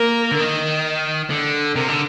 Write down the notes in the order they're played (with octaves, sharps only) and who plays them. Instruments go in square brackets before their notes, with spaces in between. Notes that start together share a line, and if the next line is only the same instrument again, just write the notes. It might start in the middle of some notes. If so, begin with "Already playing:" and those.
Already playing: [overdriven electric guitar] A#3 [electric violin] A#4
[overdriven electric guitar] D3
D#3
D3
[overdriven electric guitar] C3 [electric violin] A#4
[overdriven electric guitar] D3